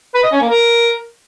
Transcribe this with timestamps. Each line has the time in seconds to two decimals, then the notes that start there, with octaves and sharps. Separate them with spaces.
0.15 B4
0.23 D#5
0.32 C#4
0.41 A#3
0.50 A#4